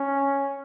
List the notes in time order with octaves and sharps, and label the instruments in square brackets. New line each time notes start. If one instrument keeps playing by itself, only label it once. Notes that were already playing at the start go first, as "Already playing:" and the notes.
Already playing: [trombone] C#4